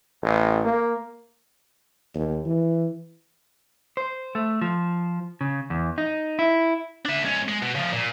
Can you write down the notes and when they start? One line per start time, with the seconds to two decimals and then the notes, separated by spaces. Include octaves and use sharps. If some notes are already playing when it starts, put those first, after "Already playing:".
0.23 A1
0.65 A#3
2.15 D#2
2.46 E3
3.97 C5
4.35 A3
4.61 F3
5.41 C#3
5.70 E2
5.98 D#4
6.39 E4
7.06 D4 E5
7.23 G#2 C#4
7.49 G#3
7.62 B2
7.75 C#3 F3
7.93 A#2